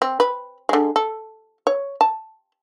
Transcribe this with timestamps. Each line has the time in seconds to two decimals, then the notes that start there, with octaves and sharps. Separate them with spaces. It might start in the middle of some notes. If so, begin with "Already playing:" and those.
0.02 C4
0.20 B4
0.69 D3 G#3
0.96 A4
1.67 C#5
2.01 A5